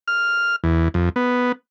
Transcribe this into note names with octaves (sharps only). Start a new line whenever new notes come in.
F6
E2
F2
B3